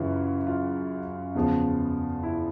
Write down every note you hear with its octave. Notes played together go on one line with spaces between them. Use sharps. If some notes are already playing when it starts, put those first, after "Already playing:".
Already playing: F#2 C#3 E3 F4
F4
E2 C#3 F3
E4